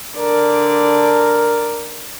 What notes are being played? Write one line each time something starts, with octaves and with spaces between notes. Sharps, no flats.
D3 A#4 D5